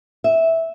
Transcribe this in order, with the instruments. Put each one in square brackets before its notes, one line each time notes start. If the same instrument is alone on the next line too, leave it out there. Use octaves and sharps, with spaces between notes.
[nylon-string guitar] E5